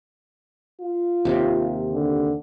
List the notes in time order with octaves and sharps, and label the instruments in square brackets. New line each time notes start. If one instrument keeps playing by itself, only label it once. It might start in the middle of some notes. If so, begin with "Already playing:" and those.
[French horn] F4
[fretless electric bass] D#2 C3
[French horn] D3